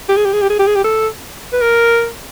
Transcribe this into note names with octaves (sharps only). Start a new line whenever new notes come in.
G4
G#4
G4
G#4
G4
G#4
G4
G#4
G4
A4
B4
A#4